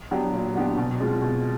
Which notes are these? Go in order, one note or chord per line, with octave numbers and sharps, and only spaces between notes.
F#3 B3 D4 G4
A#2
F#3 B3 D4 G4
B2
G#3 C4 F4
B2